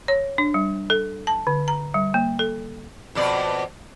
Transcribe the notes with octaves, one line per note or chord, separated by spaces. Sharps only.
C#5
D4
G3
A4
A5
D3
A#5
G3
A#3
A4
F2 B2 D5